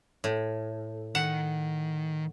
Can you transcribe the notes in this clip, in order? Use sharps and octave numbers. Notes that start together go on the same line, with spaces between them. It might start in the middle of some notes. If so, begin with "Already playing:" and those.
A2
D#3 F#5